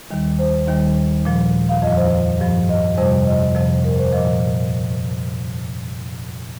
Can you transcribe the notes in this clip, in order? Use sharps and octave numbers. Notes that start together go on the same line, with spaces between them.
D#2 D#3 G3
C5
D#2 D#3 G3
A#2 F3
F5
F2 D#5
F3
C5
G2 F3
D#5
F2 C3 G3 C5
D#5
F2 C3 F3
A#4
C5
A#2 F3 D#5